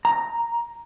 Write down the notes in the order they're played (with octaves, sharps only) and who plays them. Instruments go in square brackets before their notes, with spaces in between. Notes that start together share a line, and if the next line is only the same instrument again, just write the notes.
[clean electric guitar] A#5